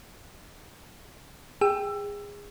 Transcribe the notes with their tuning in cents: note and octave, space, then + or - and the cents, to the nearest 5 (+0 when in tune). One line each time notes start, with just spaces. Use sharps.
G#4 -25 G5 +0 E6 +20